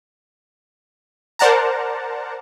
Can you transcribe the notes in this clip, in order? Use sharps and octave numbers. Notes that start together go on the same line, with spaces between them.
A#4 C5 D5 F#5 A5 A#5